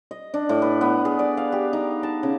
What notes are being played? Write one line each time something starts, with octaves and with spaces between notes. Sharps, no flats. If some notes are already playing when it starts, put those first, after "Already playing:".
D#5
D4
A2
B4
B3
G#4
D5
F5
G4
D#4
A5
C#3